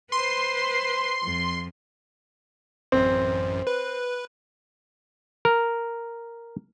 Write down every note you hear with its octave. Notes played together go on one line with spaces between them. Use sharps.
B4 C5 C6
F2
A1 F#2 C4
B4
A#4